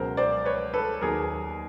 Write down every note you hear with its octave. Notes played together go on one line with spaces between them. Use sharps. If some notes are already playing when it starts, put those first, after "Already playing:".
Already playing: C#2 B2 F#3 A#4 C5
C5 D5
B4 C#5
A4 B4
D#2 D#3 F#3 G#4 A#4